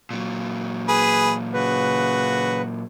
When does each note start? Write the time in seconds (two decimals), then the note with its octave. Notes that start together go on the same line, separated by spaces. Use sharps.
0.11 A#2 F#3
0.88 G#4 B4
1.53 C#3 F#4 B4